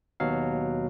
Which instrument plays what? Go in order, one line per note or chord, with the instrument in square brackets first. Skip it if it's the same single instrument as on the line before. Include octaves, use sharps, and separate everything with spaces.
[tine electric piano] D#2 B2 F#3 F5